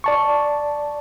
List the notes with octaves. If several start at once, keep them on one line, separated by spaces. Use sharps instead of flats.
D5 A5 C#6